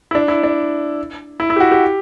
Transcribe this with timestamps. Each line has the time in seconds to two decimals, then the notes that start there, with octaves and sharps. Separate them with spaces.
0.11 E4
0.15 D4
0.28 E4
0.43 D4
1.40 E4
1.50 E4
1.56 G4
1.60 F#4
1.72 G4